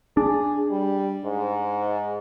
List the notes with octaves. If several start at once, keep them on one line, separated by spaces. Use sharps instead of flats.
D4 G#4
G3
G#2